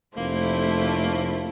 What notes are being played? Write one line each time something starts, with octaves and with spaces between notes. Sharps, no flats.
F1 A3 A#3 E4 C5